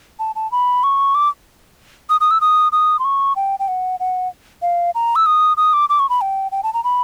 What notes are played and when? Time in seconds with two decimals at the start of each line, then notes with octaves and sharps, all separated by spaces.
0.19 A5
0.36 A5
0.52 B5
0.83 C#6
1.15 D6
2.10 D#6
2.21 D#6
2.31 E6
2.41 D#6
2.72 D#6
2.99 C6
3.05 C#6
3.36 G5
3.59 G5
3.68 F#5
4.00 F#5
4.62 F5
4.95 A#5
5.16 E6
5.26 D#6
5.57 D#6
5.73 D6
5.89 D6
5.99 C#6
6.09 B5
6.21 G5
6.52 G5
6.63 A5
6.74 A#5
6.84 B5